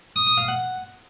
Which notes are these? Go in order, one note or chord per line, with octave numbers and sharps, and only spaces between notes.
D#6
D#6
F5
F#5